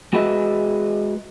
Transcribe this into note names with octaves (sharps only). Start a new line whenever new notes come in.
G#3 F#4 G#4 B4 D#5 E5